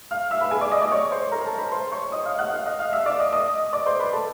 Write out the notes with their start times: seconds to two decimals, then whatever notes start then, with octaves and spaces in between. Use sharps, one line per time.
0.11 F5 F6
0.31 E5 E6
0.41 B4 B5
0.51 G#4 G#5
0.61 D5 D6
0.72 D#5 D#6
0.82 D5 D6
0.91 C#5 C#6
1.11 C5 C6
1.31 A#4 A#5
1.45 A4 A5
1.58 B4 B5
1.72 C5 C6
1.92 C#5 C#6
2.12 D#5 D#6
2.25 F5 F6
2.39 F#5 F#6
2.52 F5 F6
2.66 D#5 D#6
2.79 F5 F6
2.92 E5 E6
3.06 D5 D6
3.19 D#5 D#6
3.33 D#5 D#6
3.73 D5 D6
3.86 C5 C6
3.99 B4 B5
4.13 A4 A5